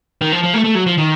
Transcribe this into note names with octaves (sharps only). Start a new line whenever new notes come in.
D#3
F3
F3
A3
A3
F#3
F3
D#3